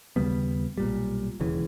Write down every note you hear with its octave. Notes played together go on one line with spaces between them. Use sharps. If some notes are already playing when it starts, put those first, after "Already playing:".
D#2 C#3 G3 B3
B1 A#2 G3
E1 D#2 C#3 E3